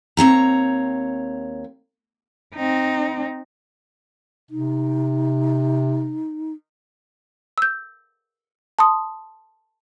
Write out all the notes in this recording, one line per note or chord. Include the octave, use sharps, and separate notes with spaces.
D#2 C4 C#5 A#5
C4 D#4
C3 D#4
E6 G6
A5 C6 D#6